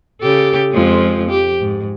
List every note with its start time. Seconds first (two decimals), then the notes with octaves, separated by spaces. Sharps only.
0.21 C#3 G4 A4
0.71 F2 F3 G#3
1.30 G4
1.61 G#2